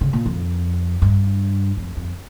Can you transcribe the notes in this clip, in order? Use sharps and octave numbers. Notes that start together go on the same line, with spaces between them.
C#3
A#2
F2
G2
F2
F2